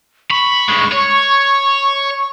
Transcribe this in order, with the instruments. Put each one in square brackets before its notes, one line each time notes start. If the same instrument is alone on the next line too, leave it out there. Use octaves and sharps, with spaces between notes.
[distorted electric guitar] B5 [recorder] C#6
[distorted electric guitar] G2 G#3
C#5